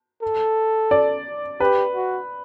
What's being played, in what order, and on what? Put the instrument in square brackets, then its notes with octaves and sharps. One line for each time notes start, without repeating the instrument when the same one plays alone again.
[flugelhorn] A4
[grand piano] D5
[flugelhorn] G4 [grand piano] B4
[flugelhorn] F#4